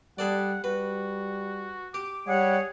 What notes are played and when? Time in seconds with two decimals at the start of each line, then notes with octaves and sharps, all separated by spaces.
0.19 G3 G#4 A4 D5 F#5
0.64 G3 F#4 B4
1.94 G4 D6
2.27 G3 G#4 C#5 F#5